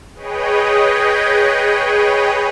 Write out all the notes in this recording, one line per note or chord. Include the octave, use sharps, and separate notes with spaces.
G#4 B4 C#5 D#5 G5